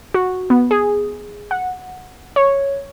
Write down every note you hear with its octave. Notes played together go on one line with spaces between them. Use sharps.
F#4
B3
G#4
F#5
C#5